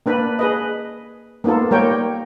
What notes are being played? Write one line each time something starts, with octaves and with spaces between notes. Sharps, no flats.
A#3 D4 B4 B5
G#4 B4 D#5
A#3 B3 D#4 F4 A4
G3 A#3 A#4 C#5 G5